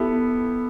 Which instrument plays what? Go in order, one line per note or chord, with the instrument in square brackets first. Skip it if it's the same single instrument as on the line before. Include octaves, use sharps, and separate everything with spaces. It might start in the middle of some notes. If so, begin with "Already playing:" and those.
Already playing: [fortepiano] B3 [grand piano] E4 G4 A4